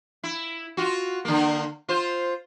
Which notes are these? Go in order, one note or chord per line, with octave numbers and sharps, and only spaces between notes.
E4
F4 F#4
D3 A#3
F4 C5